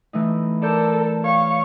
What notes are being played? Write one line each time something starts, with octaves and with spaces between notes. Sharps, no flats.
E3 A3 D#4
A4 A#4 D5 G6
C#5 F5 C#6